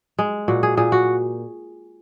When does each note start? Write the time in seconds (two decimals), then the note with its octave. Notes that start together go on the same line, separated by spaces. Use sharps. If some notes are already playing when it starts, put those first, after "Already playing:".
0.18 G#3
0.48 A#2 F#4
0.63 G#4
0.77 A#2 G#4
0.92 F#4